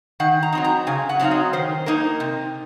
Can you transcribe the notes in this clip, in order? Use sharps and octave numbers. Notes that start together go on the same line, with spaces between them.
D#3 F#5
A#5
F#3 C4 D#4
A#5
C#3 G#5
F#5
F#3 C4 D#4 F5
D#5
D#3 C5
A#3 D#4 A#4
C3